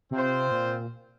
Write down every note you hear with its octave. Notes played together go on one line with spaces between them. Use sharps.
C3 C4 F4 C5
A#2